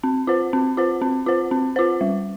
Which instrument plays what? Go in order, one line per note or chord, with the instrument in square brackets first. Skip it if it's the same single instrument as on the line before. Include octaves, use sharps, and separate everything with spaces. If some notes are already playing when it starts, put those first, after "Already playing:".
[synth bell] C4
F4 C5
C4
F4 C5
C4
F4 C5
C4
F4 C5
G3